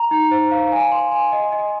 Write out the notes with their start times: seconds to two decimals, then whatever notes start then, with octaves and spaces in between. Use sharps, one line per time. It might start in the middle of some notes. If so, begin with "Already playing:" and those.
Already playing: A#5
0.11 D#4
0.31 C5
0.51 F5
0.72 G#5
0.92 C6
1.12 G#5
1.32 D#5
1.52 D#5